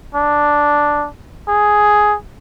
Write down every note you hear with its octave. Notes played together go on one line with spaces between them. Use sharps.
D4
G#4